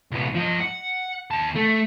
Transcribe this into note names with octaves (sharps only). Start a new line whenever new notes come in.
C2 B3
F3 D#5
F#5
D#2 A5
A3